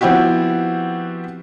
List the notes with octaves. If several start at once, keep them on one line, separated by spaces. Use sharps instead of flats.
F3 B3 C4 E4 F#4 G4